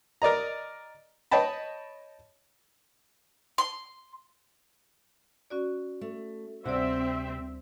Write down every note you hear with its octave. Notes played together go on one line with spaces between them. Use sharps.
A#4 D5 D#5 A#5
C#5 D#5 G5 A5 B5
C6
C#4 F#4 D5
A3
D2 C3 G3 C4 D5 E5